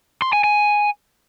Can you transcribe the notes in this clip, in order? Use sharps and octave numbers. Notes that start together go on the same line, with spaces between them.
C6
G#5
G#5